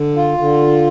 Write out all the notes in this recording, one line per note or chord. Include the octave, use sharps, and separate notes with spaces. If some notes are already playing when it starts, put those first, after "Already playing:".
Already playing: D3
F4
D3